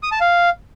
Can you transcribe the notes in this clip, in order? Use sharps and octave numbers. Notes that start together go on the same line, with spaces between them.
D#6
A5
F5